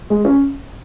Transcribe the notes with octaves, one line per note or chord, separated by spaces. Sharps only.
G#3
C#4